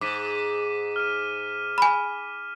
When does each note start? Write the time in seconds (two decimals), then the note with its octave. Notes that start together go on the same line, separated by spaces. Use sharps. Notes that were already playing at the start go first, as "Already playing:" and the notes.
0.01 G#2 D6 B6 D#7
0.96 F6 D#7
1.78 G#5 B5